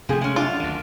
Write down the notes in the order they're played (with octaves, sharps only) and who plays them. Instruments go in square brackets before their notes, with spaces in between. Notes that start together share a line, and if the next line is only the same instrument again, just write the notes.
[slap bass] C3 A3 [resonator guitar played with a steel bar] F3 C4 G#4
[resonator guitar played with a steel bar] G#3 C#4
[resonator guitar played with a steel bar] F#2 D4 [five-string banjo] F4
[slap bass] D2 D#3